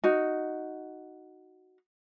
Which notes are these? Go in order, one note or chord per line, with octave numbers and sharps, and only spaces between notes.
D#4 F#4